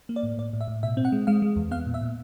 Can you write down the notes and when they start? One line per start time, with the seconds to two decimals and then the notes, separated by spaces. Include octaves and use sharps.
0.09 A#3
0.16 D5
0.23 A2
0.38 A2 D5
0.53 A2
0.61 E5
0.68 A2
0.83 B2 E5
0.97 C4
1.05 F#5
1.12 G#3
1.27 G#3 F5
1.42 G#3
1.56 E2
1.71 B3 F5
1.86 A#2
1.94 E5
2.01 A#2